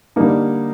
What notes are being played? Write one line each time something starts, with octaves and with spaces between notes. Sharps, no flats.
D3 G3 A#3 D#4